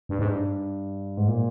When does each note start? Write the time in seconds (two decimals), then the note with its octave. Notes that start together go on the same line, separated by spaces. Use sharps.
0.09 G2
0.19 G#2
0.28 G2
1.17 G#2
1.28 A#2